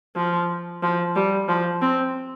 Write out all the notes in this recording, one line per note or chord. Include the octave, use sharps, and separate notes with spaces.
F3
F3
G3
F3
C4